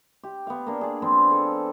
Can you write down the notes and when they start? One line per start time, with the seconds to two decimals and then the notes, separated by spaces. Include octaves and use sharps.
0.23 G4
0.47 B3 F5
0.67 A#3 D4
0.81 G#4 D5
1.02 F3 B3 C4 D4
1.31 A4